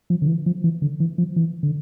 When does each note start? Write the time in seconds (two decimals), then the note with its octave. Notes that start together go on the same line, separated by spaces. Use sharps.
0.10 F3
0.22 D3
0.28 E3
0.46 F3
0.64 E3
0.82 D3
1.00 E3
1.18 F3
1.36 E3
1.63 D3